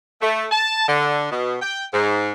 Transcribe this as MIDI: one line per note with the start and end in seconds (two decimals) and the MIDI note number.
0.22 0.45 57
0.51 0.87 81
0.88 1.28 50
1.31 1.56 47
1.62 1.84 79
1.93 2.32 44